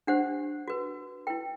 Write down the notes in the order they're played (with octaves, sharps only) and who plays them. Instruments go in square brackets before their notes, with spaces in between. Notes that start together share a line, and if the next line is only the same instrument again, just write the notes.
[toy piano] D4 G4 C5 F#5
F#4 B4
E4 B4 G5